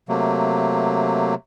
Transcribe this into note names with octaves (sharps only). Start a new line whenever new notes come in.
C3 F#3 A3 A#3